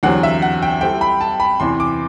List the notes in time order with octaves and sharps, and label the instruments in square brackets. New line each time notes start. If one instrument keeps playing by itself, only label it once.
[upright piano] E2 D3 F#3 C4 G4 [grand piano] F#5
[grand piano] E5
F#5
G5
[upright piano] G3 C4 E4 A4 C5 [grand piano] G5
[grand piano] B5
A5
B5
[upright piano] E2 C3 E3 [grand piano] C6
[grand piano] D6